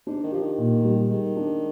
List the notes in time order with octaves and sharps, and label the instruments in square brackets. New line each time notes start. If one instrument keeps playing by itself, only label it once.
[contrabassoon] G#2 [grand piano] D4
[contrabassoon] D#3
[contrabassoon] F3 [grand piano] G4
[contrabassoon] D#3
[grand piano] A#2
G3
[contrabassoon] D#3 [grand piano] G#3
[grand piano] D4